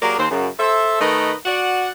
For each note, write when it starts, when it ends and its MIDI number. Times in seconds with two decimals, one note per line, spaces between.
0.03 0.16 54
0.03 0.16 58
0.03 0.16 67
0.03 0.16 68
0.03 0.16 70
0.03 0.16 74
0.19 0.28 39
0.19 0.28 60
0.19 0.28 72
0.31 0.48 42
0.31 0.48 49
0.60 0.98 69
0.60 0.98 72
0.60 0.98 76
1.01 1.33 51
1.01 1.33 57
1.01 1.33 63
1.01 1.33 70
1.01 1.33 71
1.01 1.33 75
1.46 1.92 66
1.46 1.92 74
1.46 1.92 78